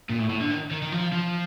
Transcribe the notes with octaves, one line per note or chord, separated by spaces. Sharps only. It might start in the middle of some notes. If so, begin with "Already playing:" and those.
A#2
A2
A2
D3
D#3
D#3
D#3
F3
F3